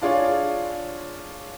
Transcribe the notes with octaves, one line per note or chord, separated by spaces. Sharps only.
D4 F4 G#4 C#5